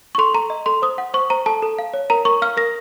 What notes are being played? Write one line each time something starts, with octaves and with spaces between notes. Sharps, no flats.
C#6
A4 C6
A4 A#5
D#5
A4 C6
C5 D#6
F#5
C5 C#6
C5 A#5
A4 A5
A4
F5
C#5
A#4 A#5
A#4 C#6
F5 F6
A#4 A#6